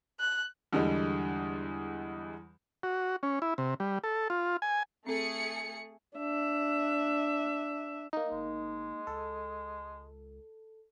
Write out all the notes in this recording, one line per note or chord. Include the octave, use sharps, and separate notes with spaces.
F#6
E2 D3 G3 G#3
F#4
C#4
E4
C3
G3
A4
F4
G#5
A3 C4 G#4 A4 C#7
D4 E5
A#3 D#4
G1 G#3
C#2 A4